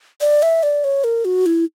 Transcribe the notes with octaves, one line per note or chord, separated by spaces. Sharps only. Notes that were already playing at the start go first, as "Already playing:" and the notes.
D5
E5
D5
C#5
A#4
F#4
E4